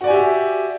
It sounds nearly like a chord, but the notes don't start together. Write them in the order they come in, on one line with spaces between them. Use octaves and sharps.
F#4 D5 G#5 G4 E5